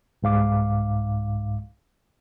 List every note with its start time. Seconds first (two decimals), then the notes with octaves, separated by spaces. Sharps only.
0.23 C2 G#2 F5 D6